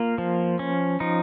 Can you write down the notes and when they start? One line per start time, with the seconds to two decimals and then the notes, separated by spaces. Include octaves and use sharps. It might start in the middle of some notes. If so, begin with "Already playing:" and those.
Already playing: A#3 F4
0.18 F3
0.59 C#4
1.00 F3 D#4